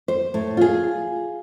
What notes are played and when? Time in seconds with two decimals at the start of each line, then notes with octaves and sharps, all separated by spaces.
0.08 C5
0.34 A2
0.57 F4 G#4